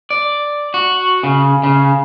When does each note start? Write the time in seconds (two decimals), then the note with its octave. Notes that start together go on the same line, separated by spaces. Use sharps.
0.10 D5
0.74 F#4
1.23 C#3
1.63 C#3